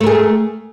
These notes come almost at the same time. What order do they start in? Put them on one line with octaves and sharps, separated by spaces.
A3 A#4 G#4